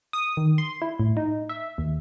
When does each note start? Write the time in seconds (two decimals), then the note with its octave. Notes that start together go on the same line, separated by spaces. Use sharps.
0.13 D#6
0.37 D#3
0.58 C6
0.82 E4
1.00 A2
1.17 D#4
1.49 E5
1.78 D#2